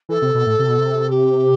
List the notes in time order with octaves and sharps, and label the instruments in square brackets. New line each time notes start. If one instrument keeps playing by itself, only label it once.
[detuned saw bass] E3 [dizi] A4
[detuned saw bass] C3
B2
A2
C3
B2
C3
[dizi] G4